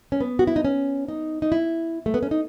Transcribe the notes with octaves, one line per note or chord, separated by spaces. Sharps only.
C#4
B3
F#4
E4
D#4
C#4
D#4
D#4
E4
A3
B3
C#4
D#4